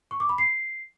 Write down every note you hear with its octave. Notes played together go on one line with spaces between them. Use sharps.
C#6
D6
B5
C7